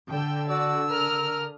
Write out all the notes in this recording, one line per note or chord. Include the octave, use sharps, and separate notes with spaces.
D3 G5 E6
F#4 D5 E6
A#4 D#6 F6